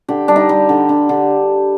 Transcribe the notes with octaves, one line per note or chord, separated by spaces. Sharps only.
D3 G4
G3 D4
D#4
G3
D3
D3
D3